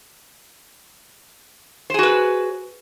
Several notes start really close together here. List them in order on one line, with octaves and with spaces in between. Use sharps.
C5 G#4 F#4 B4